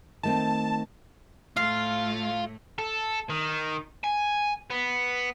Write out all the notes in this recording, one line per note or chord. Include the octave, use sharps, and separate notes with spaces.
D#3 A3 C4 A5
A2 A3 F4 F5
A4
D#3
G#5
B3